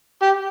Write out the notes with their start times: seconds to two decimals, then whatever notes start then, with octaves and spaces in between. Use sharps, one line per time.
0.23 G4